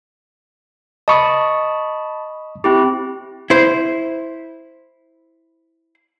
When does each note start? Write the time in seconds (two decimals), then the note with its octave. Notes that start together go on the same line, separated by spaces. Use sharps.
1.08 D#5 A5 B5 C#6 D#6
2.64 C4 E4 G4
3.50 E4 C5